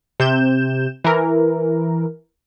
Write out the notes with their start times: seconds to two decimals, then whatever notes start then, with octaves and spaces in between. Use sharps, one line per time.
0.20 C3 G6 E7
1.04 E3 A#4